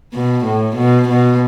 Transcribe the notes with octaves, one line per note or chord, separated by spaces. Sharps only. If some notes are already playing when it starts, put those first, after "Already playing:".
B2
A2
B2
B2